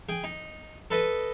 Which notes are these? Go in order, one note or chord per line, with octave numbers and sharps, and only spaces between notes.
G#4 G5
D#4
A4 B4 D#5